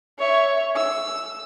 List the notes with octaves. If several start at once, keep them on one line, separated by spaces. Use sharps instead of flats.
C#5 E5
E6